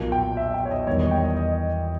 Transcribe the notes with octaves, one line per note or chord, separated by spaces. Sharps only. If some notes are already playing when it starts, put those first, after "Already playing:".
Already playing: B1 A#2 A#3
G5
E5
G5
C#5
D#5
E1 E2 D#3 G3 C#5
D#5
G5
D#5
D#5